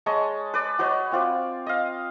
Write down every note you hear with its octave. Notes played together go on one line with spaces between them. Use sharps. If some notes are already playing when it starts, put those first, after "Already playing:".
G#3 C#5 D#5 A5
B4 D5
F#4 B4 C#5 D#5
C4 F4 D5
D#5 F5